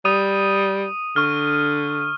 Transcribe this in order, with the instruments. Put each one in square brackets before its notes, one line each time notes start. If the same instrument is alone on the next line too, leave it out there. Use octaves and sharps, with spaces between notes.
[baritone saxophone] G3 [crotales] D#6 D#7
[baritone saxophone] D3 [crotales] C#6 F6